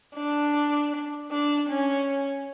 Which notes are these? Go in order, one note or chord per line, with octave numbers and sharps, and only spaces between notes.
D4
D4
C#4